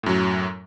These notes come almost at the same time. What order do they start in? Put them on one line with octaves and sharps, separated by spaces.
A2 F#2 F#3